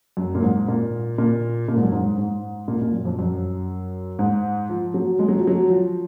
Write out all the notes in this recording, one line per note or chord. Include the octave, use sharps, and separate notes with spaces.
F#2
A#2
G#2
A#2
A#2
A#2
G#2
F#2
G#2
G#2
A#2
A#2
F#2
F2
F#2
G#2
F3
F#3
G#3
F#3
F3
F#3
F3